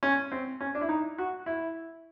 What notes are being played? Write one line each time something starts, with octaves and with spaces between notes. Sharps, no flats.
C#4
C4
C#4
D4
E4
D#4
F#4
E4